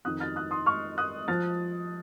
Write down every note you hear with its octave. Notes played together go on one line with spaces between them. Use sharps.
F2 D#3 D#6 F#6
F6 A6
D#6 F#6
C6 D#6
C#6 F6
D#6 F#6
F3 F6 A6